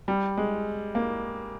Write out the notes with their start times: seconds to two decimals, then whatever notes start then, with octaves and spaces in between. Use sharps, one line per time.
0.08 G3
0.37 G#3
0.95 A#3